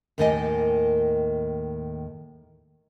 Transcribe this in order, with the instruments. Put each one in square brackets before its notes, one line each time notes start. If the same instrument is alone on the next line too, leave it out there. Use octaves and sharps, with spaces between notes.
[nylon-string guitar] D#2 A2 D#3 D5 D#5 G#5